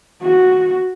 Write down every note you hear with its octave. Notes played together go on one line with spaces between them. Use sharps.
F#4